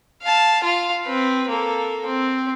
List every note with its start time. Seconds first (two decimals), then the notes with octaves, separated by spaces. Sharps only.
0.23 F5 A5
0.64 F4 F5
1.05 C4 B4
1.50 A#3 A4
2.06 C4